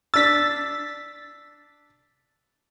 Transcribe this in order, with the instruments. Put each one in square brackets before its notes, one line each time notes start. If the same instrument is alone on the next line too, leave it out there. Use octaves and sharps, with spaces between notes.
[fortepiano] D4 E6 [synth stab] A6 B6